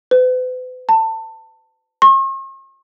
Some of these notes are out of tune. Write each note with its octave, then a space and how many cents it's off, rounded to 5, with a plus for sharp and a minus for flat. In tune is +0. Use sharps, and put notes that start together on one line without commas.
B4 +45
A5 +25
C#6 -45